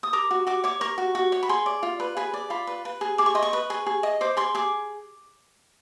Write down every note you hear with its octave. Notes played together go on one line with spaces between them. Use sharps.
D#6
A#4 D6
F#4
F#4 D6
C#5 D6
A#4 C#6
F#4
F#4
C#5
B5
G#4 C6
D5
F4
B4
G#4 B5
D5
F4 B5
B4
B4
G#4
G#4 D6
C#6
D#5 C6
C#6
B4
G#4
G#4
D#5
C5 D6
G#4 C6
G#4 D6